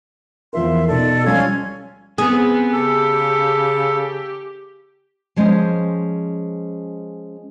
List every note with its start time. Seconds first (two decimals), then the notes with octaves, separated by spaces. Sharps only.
0.53 E2 F3 A#4 E5 C6
0.88 B2 D#4 A4 D5
1.26 F3 G3 C#4 F4 G#6
2.18 B3 C4 G#4
2.72 C#3 G4 A4
5.36 F3 G#3 B3 C#4 C5 D#5